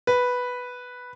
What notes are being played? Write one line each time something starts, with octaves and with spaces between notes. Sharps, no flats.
B4